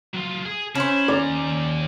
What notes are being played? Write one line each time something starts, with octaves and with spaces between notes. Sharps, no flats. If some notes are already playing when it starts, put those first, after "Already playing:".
F#3 F4
G#4
C#4 E4 C5
D#2 D5 A#5